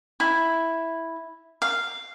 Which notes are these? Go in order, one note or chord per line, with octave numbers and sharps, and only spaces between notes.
E4
F5